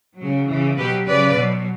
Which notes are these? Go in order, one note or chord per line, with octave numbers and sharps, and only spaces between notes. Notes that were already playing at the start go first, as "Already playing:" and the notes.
C#3 F#3
C#3 E3
B2 F#3 G4 B4
C#3 F#3 B4 D5
B2 F#3